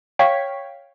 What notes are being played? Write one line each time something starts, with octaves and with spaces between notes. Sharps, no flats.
C#5 F5 G5 C#6 G#6 B6